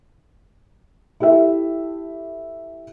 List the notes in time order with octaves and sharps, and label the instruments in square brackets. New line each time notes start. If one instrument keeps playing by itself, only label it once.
[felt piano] E4 G4 A4 E5